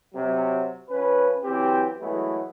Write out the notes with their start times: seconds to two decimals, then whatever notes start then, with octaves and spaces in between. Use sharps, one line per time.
0.14 C3 F#3
0.89 F3 C#4 B4
1.44 E3 F#3 C4 G4
2.01 E3 F#3 G#3 A3 B3